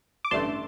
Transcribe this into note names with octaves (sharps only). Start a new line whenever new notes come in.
D6
A1 G2 D3 A3 A5 C6